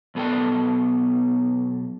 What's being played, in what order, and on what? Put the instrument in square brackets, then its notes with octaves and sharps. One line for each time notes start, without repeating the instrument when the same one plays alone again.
[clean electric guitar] B1 B3 A4 G5